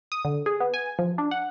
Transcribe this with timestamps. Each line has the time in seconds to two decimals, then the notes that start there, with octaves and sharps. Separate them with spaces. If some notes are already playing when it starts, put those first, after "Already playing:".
0.12 D#6
0.25 D3
0.46 G#4
0.60 B3
0.74 G#5
0.99 F3
1.18 D4
1.31 F#5